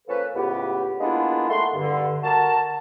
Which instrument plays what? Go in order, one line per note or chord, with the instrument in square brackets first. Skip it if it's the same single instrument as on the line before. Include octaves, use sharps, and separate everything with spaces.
[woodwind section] F3 A#3 C#4 A4 B4
C#2 A2 B3 G4
G#3 A#3 B3 D4 E4 F4
A3 A#3 F#5 C6
G2 D3
F#4 A#4 A5